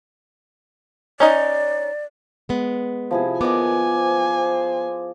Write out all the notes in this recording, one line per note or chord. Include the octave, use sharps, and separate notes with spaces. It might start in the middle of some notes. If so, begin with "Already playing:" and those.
C#4 D#4 D5 D#5
G#3 B3
C3 F3 E4 G#4
D#2 F3 B3 A#4 D5 D#5 G#5 D6
C5